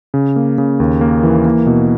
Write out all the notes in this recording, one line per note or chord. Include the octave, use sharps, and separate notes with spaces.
C#3
A#3
C#3
D#2
A#3
E3
A#3
B2